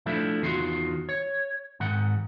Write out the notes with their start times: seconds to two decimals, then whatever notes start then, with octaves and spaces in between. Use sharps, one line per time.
0.06 F3 A3 D4 E4
0.42 E2 D#3 F4 F#4 C6
1.09 C#5
1.80 G#2 D#3 F#5